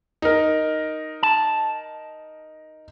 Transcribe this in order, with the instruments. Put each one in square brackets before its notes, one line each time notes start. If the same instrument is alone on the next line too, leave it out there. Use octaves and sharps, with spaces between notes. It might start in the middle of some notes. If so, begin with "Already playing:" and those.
[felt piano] D#4 A#4
[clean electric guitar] A5